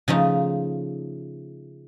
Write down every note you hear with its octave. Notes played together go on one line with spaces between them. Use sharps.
C#3 F3 A3 D#4